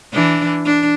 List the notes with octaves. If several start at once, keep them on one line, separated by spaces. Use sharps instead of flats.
E3 D4
D4